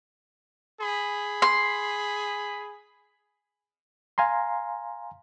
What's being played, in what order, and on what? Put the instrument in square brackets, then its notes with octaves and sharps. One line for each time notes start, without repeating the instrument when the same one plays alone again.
[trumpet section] G#4 B5
[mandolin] C6
[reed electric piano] F5 G#5 A#5 C6